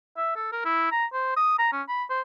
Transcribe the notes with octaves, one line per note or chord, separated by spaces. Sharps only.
E5
A4
A#4
E4
A#5
C5
D#6
A#5
C#4
B5
C5